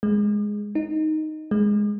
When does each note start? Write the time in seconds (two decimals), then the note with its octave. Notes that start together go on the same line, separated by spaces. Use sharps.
0.03 G#3
0.75 D#4
1.51 G#3